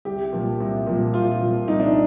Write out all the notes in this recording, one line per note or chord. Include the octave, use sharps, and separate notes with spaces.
C2 G4
A#2 F3
C2
A#2 F3
C2 F4
A#2 F3
C2 D#4
D4